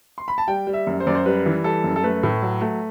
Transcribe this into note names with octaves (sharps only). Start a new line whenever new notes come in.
C6
B5
A5
G3 G5
G3
E5
F#2
C5
F#2 D5
C5
G3 B4
E3
G3 A4
F#2
A4
A3 B4
A2
F#3
A3